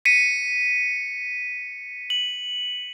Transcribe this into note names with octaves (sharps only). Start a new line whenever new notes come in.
B6 C#7 D#7
F#7